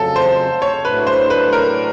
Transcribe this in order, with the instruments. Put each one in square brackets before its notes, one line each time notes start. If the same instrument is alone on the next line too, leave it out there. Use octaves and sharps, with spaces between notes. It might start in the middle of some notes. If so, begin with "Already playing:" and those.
Already playing: [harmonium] F2 C#3 F#3 [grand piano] A4
[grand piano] C5
C#5
[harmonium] A2 F#3 A3 D4 [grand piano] B4
[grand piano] C5
B4
A#4